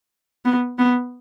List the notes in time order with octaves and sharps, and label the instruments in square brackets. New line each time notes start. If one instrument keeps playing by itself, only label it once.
[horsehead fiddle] B3
B3